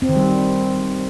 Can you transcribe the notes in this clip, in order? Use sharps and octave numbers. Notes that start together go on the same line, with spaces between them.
C4
D#3
G3